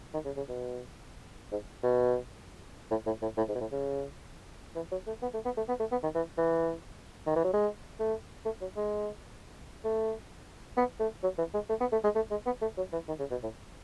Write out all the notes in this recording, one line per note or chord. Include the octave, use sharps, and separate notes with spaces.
D#3
C#3
C#3
B2
G#2
B2
A2
A2
A2
A2
G#2
B2
A2
C#3
E3
F#3
A3
B3
A3
B3
A3
B3
A3
B3
D#3
E3
E3
D#3
E3
F#3
G#3
A3
A3
F#3
G#3
A3
B3
A3
F#3
E3
G#3
A3
B3
A3
G#3
A3
G#3
B3
A3
F#3
E3
D#3
C#3
B2
A2